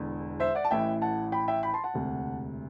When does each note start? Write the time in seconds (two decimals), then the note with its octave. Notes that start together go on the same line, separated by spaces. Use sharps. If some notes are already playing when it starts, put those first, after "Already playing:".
Already playing: E1 E2 D3
0.40 C5 E5
0.55 D5 F#5
0.64 A5
0.71 A1 A2 E3 E5 G5
1.02 F#5 A5
1.32 G5 B5
1.48 E5 G5
1.63 G5 B5
1.73 A5 C6
1.84 F#5 A5
1.94 E1 D2 C3